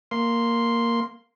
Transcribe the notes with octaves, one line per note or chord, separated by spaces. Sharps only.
A#3 C6